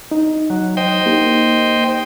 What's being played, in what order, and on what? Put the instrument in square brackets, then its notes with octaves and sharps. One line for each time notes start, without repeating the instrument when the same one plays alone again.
[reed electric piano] D#4
[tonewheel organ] F#3
C5 D#5 G5
[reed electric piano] A#3 D#4 G4